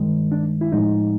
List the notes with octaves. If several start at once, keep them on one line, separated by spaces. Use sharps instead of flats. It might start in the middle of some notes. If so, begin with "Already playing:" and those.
Already playing: G2 D#3 G#3
D4
E4
A2 F3 G#3 D#4